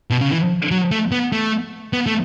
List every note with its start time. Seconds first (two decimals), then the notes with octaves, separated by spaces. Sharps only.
0.10 B2
0.21 C#3
0.31 E3
0.71 F#3
0.91 A3
1.12 B3
1.32 A3
1.93 B3
2.06 A3